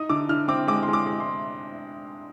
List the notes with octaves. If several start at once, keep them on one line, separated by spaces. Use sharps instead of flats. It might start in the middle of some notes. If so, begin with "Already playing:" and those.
Already playing: D#4 D#6
D3 D6
D3 F6
C4 D6
G#3 D6
C6
G#3
D6
G#3
C6